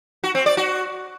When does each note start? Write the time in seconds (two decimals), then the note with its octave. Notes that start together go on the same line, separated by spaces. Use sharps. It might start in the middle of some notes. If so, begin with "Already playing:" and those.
0.24 F#4
0.35 C4
0.46 D5
0.57 F#4